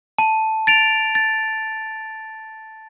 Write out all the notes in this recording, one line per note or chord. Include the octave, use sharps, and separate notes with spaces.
A5
A6 D7 F7
A6